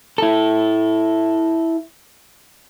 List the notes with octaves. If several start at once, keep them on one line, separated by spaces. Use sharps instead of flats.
E4 A4